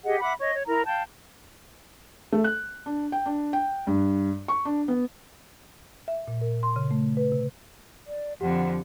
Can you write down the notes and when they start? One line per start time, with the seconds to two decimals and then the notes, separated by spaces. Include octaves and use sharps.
0.06 G4 G#4 D#5 F#5
0.21 E5 F#5 B5 D6
0.40 C#5 D#5 C#6
0.53 C#5
0.66 E4 A#4 A#5
0.85 F5 G5 A5 G6
2.32 A3
2.44 F#6
2.86 D4
3.12 G5
3.26 D4
3.53 G5
3.87 G2
4.48 C#6
4.65 D4
4.88 B3
6.08 E5
6.28 A#2
6.41 A#4
6.63 C6
6.76 C#3
6.91 A3
7.17 B4
7.32 C3
8.07 D5
8.41 F2 D3 F3 G4 F#5